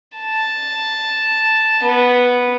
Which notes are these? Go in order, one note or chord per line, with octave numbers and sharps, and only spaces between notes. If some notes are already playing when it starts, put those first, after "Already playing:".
A5
B3